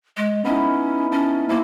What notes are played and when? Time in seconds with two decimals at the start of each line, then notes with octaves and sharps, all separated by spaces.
0.17 G#3
0.45 B3 C#4 D#4 E4
1.12 C#4 A5
1.49 A#3 E4 A#5 C6